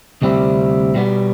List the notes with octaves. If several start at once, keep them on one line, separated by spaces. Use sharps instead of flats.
D2 C3 G3 C4 E4
B2 G3 B3